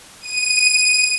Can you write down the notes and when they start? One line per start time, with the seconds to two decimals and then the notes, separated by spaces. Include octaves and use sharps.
0.21 D#7